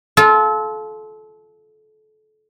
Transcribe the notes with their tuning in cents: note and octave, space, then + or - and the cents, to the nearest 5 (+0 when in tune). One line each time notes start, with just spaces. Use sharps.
F4 +0 A4 -30